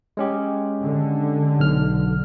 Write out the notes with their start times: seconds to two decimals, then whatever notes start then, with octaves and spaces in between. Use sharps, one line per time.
0.17 G#3 C#4 G4
0.83 D3
1.60 B1 F6